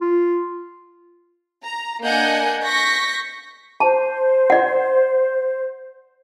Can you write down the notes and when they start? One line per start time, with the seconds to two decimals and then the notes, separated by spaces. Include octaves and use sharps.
0.01 F4
1.64 A#5
2.04 A#3 D4 D#5 F#5 G#5 G6
2.63 C#6 G6 A#6 B6
3.80 C5 A5
4.50 D5 F#5